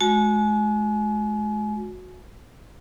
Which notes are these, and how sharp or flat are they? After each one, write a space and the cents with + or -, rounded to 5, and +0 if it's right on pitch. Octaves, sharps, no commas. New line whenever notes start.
G#3 +35 F#4 -20 G#5 +30